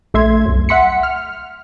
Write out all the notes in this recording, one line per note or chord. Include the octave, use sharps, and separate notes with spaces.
A#1 A3 E5 C6 G#6
C2 F#2
E5 F#5 C6 B6 C#7
F6